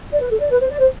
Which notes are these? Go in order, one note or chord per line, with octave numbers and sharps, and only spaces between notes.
D5
B4
A4
D5
B4
C5
D5
C5